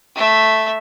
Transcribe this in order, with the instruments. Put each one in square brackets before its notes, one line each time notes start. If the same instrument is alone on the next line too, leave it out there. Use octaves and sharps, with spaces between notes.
[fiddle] A3 E5